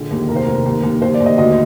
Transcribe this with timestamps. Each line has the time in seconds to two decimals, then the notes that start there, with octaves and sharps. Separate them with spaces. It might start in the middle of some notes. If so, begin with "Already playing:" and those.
Already playing: A#1 D3 G#4
0.11 D#2
0.28 F1 A#4
0.36 C5
0.43 F1 A#4
0.66 D#2
0.83 D#2
1.02 D#2 C5
1.14 D5
1.20 D#2
1.26 D#5
1.38 D2 D#5